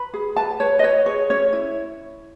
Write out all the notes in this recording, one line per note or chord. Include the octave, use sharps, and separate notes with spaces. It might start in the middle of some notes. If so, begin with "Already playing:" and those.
Already playing: B4 B5
G#4
B4 A5
B4 C#5
D#5
B4 C#5
G#4 C#5
C#4 C#5
E4